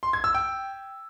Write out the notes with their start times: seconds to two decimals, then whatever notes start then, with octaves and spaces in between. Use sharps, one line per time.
0.03 C6
0.13 G#6
0.24 E6
0.35 G5